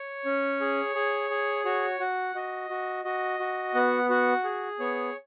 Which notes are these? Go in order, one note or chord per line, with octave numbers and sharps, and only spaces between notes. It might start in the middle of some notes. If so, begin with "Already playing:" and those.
Already playing: C#5
C#4
G#4
G#4
G#4
F#4 C#5
F#4 F#5
F#4 D#5
F#4
F#4 D#5
F#4
B3 F#5
F#4 F#5
G#4
B3 C#5